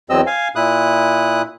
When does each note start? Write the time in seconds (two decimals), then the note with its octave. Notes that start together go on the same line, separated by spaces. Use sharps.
0.10 E2 F#3 C4 D#5 E6
0.27 F5 G#5
0.56 A#2 E4 D#6 F#6